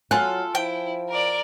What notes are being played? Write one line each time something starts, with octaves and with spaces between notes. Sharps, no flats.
F#3 F4 A4 G#5 F#6
F3 E4 G5
A#4 D5